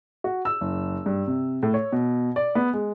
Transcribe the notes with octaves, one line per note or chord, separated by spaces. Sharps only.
F#4
E6
F#1
G2
C3
A2
C#5
B2
D5
B3
G#3